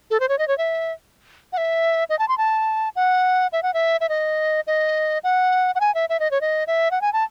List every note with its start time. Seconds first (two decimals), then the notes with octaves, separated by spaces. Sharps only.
0.11 A4
0.20 C5
0.29 C#5
0.39 D#5
0.48 C#5
0.58 E5
1.53 F#5
1.57 E5
2.09 D#5
2.19 A5
2.28 C6
2.38 A5
2.96 F#5
3.53 E5
3.63 F#5
3.74 E5
4.01 E5
4.09 D#5
4.67 D#5
5.24 F#5
5.75 F#5
5.80 G#5
5.95 E5
6.09 E5
6.20 D#5
6.31 C#5
6.41 D#5
6.67 E5
6.91 F#5
7.01 G#5
7.13 A5